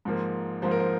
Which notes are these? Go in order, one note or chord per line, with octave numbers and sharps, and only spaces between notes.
G#2 F3 A#3
G#2 F3 A#3 C5
A#4
C5